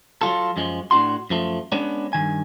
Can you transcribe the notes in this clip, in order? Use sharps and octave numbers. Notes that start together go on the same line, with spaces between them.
F#3 G#3 F4 A4
F#2 F3 G#3
A2 D4 F#4 C6
F#2 F3 A3
G#3 B3 C#4 D4
G2 D#3 G#5